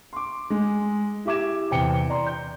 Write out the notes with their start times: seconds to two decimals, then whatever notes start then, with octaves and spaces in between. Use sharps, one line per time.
0.13 C6 D6
0.50 G#3
1.25 E4 G4 E5 D6 G#6 E7
1.71 E2 C3 G5 C#7 G7
2.10 D5 A#5 C6
2.27 G6